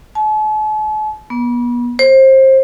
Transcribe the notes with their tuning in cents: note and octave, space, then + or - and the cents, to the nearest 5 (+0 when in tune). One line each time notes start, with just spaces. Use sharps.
A5 -45
B3 -35
C5 +25